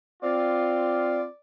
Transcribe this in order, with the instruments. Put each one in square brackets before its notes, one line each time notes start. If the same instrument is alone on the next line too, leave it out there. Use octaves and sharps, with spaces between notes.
[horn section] C4 F4 [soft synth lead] D5